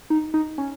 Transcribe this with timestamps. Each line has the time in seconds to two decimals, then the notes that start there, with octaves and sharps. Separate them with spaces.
0.10 D#4
0.34 D#4
0.58 C#4